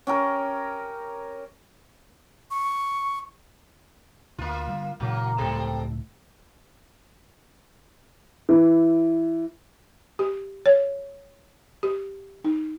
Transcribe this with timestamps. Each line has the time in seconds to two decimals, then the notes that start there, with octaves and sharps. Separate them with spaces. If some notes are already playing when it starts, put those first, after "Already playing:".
0.07 C#4 G4 A#4
2.51 C#6
4.38 D2 A#3 F4
4.67 D3 G3
5.00 A#2 C#3 E3 F#3 A#3
5.38 C#2 A2 G3 C4 A4
8.49 E3
10.19 G4
10.66 C#5
11.83 G4
12.44 D#4